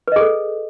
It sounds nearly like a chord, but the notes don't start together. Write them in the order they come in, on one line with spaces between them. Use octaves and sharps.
B4 D#5 G#4 A4